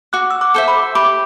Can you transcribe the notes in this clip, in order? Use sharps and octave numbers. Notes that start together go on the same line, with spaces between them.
F#4 D6 F#6
E6
D6 F#6
A4 C5 E5
B5 D6
G4 B5 D6